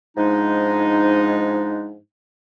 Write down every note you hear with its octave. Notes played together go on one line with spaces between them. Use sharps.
G#2 F3 G#3 D4 D#4